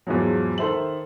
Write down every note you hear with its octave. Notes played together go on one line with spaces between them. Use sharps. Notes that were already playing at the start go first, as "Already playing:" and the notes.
E2 G#2 F3 F#3
D#3 A4 C5 E5 F#7